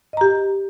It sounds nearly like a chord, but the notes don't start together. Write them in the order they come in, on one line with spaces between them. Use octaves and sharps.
D#5 A#5 G4